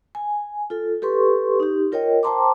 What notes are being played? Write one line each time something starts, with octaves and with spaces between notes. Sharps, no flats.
G#5
F4 A4
G4 A4 B4 C6 C#6
D#4 G4
F4 A#4 C#5 D#5 G5
C5 G5 A5 A#5 C6 D6